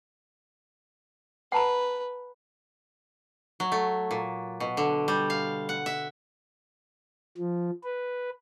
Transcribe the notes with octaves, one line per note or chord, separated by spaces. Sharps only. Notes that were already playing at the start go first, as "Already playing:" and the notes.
B4 F#5 A5 A#5
F#3
A3
A#2
B2
D3
G3
F5
F#5
E5
F3
B4